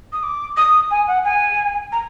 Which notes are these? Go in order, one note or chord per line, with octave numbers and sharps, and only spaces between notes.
D#6
D6
D#6
G#5
F#5
G#5
A#5